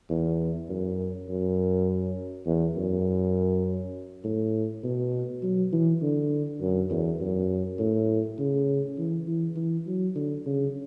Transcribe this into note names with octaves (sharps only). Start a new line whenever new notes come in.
E2
F#2
F#2
E2
F#2
A2
B2
F#3
E3
D3
F#2
E2
F#2
A2
C#3
E3
E3
E3
F#3
D3
C#3